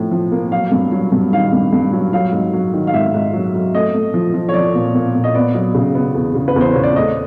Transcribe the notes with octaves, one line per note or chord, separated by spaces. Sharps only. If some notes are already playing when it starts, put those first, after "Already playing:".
Already playing: A2 F3
F3
A#3
F#3 F5
G2
F#3
G2
D#3 F5
G2
G2
F#3
F#3 F5
G#2
F#3
D#3
F5
G#2 E5
G#2
F#3
F#3
A3 D#5
A3
F3
F3
C#5
F3 D5
A#2
A#2
A#2
D#5
B3 D5
F#3
C#3
B3
E2
C#3
B4
E2 C5
C#3 C#5
D5
A3 D#5